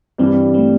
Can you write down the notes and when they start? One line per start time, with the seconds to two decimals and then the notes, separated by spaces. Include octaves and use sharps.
0.18 G2 E3 G3 C4
0.54 C4
0.58 A3